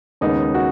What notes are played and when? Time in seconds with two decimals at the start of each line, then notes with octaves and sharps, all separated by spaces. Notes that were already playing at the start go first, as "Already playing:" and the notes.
0.21 D#2 C#3 G#3 B3 D#4
0.54 F#4